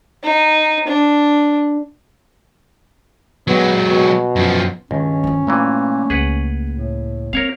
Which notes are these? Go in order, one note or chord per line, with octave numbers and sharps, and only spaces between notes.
D#4
D4
F#3 G#3 B3
B2
F#2 F3
C#2 G2 D#3 C#4
F3 F4
G2 A#2 E3 A3 A#3
C#2 G#4 B4 F#5
A2
C4 A#4 C#5 F5